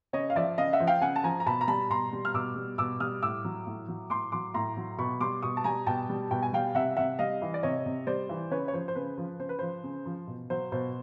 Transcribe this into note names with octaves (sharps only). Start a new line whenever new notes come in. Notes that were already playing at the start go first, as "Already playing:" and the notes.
C#3 C#5 D#5
F5
F3 D5 E5
C#3 D#5 F5
E5 F#5
F3
F5 G5
C#3 F#5 G#5
A5
F3 G#5 A#5
A#5
B2 A5 B5
A#5
G3 A5 B5
B2 A#5 C6
G3
F6
B2 D6 E6
G3
B2 D6 E6
G3 D#6 F6
A2 D6 E6
F#3
A2
F#3
A2 C6 D6
F#3 C6 D6
A2 A#5 C6
F#3
B2 B5 C#6
G3 C6 D6
B2 C#6 D#6
A5
G3 G#5 A#5
B2 G5 A5
G3
B2 G5
G#5
G3 F5 G5
C3 E5 F#5
C3 E5 F#5
G3 D#5 F5
E3
D5
C3 C#5 D#5
C3
G3 C5 D5
E3
C#3 B4 C#5
C#5
F3 C5
C5
C#3 B4
F3
C#3 C5
B4
F3 C5
C#3
F3
B2
F#3 C5
B2 C5